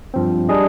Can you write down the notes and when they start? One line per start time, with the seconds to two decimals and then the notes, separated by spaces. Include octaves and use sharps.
0.14 G2 F3 C4
0.49 G3 D4 G#4 D#5